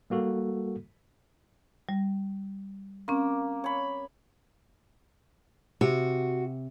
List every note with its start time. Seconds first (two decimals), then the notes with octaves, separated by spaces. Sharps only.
0.10 G3 A#3 F#4 A4
1.89 G3
3.08 A#3 C4 C#4
3.64 C#5 B5
5.81 C3 F#4